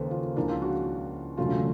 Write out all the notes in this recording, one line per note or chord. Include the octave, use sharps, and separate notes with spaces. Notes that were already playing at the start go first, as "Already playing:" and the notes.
Already playing: D#2 C#3 F3 A#3 A4 B4 C5
F4
C#2 C#3 F3 A#3 D4 E4
F4
F#4
E1 E2 C#3 F#3 A3 F4